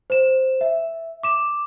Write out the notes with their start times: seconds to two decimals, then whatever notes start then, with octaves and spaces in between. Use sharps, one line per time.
0.10 C5 E7
0.61 E5
1.23 D6 E7